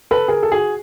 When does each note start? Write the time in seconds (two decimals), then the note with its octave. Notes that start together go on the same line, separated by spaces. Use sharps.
0.11 A4 B4
0.28 G#4 A#4
0.43 A4
0.51 F#4 G#4